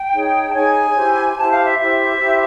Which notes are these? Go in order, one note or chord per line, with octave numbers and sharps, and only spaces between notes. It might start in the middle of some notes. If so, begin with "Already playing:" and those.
Already playing: G5
D#4 G#4 C#5
A5
D#4 G#4 C#5 G#5
E4 G4 C5
E4 G4 C5 A5
F5
E5
E4 G4 C5 E5
E4 G4 C5